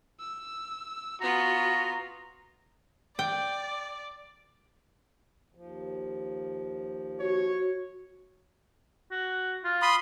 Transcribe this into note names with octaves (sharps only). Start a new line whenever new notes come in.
E6
B3 F4 F#4 A#5
D5 G5
D#2 F3
F#4 C#5
F#4
F4
B5 C6 D#6